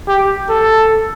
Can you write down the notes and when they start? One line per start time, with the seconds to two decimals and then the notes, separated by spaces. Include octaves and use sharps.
0.08 G4
0.50 A4